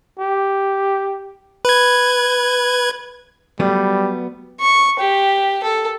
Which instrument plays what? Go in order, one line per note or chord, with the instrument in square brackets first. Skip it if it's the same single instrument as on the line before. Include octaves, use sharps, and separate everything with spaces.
[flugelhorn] G4
[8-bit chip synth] B4 G#6
[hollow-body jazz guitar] F#3 A3 B3 [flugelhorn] G3
[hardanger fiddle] C#6
G4
A4